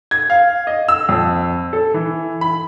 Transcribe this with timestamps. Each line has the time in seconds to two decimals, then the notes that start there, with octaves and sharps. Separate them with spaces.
0.11 G#6
0.30 F5
0.67 D#5
0.88 E6
1.09 F2
1.73 A4
1.94 E3
2.41 B5